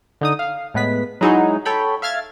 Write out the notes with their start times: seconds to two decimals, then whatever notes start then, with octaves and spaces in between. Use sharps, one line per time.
0.21 D3 D#4 D#6
0.39 F5
0.74 A2 G#3 B3 B4 B6
1.21 F#3 G#3 D#4 E4 F#4 G#4
1.65 A4 C#5 G5 B5
2.02 E5 F5 F6 G#6 A6